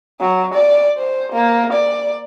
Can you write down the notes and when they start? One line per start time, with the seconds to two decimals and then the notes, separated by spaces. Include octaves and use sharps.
0.20 F#3
0.54 D5
0.98 C5
1.32 A#3
1.73 D5